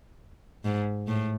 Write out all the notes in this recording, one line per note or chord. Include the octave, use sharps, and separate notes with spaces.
G#2
A2